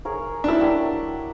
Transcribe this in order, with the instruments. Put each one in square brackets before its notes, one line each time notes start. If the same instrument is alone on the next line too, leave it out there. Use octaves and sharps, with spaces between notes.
[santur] G#4 A#4 C#5
[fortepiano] D4 E4
[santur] F#3 G4 A#4